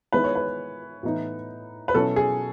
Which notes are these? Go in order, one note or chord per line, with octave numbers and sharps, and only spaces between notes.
D#3 G#3 B3 E4 B4
C#5
B4
A2 E3 B3 D#4
B4
B2 F#3 C#4 E4 A4
G#4